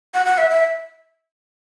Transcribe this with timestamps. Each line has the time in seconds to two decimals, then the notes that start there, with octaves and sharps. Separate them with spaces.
0.14 F#5
0.26 F#5
0.38 E5
0.50 E5